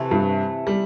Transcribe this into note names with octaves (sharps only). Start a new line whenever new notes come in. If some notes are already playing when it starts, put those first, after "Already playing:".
Already playing: C3 E3 A3
G2
G3